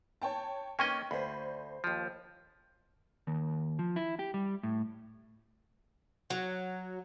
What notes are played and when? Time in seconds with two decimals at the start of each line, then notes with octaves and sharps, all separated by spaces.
0.22 C#5 G5 A5
0.79 A#3 C#4 D#5 G5 C#6 G#6
1.11 D2 C5 B5
1.84 D#2 F3
3.27 D#2
3.79 F3
3.96 E4
4.19 G4
4.34 G3
4.63 A2
6.30 F#3